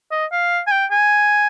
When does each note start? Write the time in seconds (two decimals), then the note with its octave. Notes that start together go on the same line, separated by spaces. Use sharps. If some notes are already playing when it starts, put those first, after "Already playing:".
0.12 D#5
0.32 F5
0.67 G#5
0.72 G5
0.91 G#5